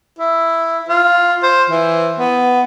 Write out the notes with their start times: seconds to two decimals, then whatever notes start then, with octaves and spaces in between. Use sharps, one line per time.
0.19 E4
0.89 F4
1.43 C5
1.70 E3
2.19 B3